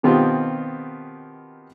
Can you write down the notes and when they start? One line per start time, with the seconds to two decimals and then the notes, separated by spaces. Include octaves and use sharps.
0.03 B2 D#3 B3 C4 F4 G4